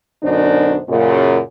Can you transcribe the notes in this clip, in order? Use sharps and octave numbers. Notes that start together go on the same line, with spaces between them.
F#2 B2 D3 D4 D#4 C5
F#2 A#2 C#3